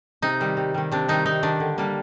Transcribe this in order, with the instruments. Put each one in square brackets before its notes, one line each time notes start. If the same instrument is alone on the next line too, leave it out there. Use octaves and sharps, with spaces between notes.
[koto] C3 D#4
D#3 G3
C3
D#3 G3
C3 D4
D#3 G3 D#4
C3 D#4
D#3 G3 D4
D3
G3 A#3 D4